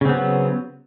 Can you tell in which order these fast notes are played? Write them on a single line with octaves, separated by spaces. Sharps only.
C#3 C4 B3 F#3